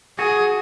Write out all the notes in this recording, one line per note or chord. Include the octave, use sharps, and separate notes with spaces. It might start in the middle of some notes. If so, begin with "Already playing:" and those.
F#4 G#4